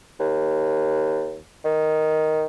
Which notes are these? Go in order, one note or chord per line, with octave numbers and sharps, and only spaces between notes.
D#2
D#3